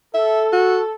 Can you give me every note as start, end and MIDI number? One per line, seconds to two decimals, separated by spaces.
0.14 0.95 69
0.14 0.46 76
0.53 0.79 66